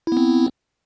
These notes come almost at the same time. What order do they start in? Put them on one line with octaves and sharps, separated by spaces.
E4 B3 C4